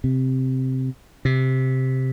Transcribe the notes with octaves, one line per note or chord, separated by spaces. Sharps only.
C3
C3